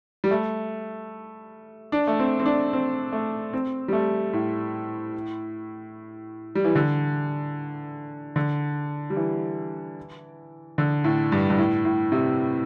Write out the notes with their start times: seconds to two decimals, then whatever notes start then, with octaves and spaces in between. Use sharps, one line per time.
0.24 G3
0.31 A3
1.92 D4
2.07 A3
2.19 C4
2.40 C4
2.45 D4
2.73 C4
3.13 A3
3.53 C4
3.88 G3
3.93 A3
4.33 A2
6.55 G3
6.64 E3
6.75 D3
8.36 D3
9.10 G3
9.16 E3
10.78 D3
11.04 A2
11.32 G2
11.50 G2
11.58 A2
11.85 A2
12.12 C3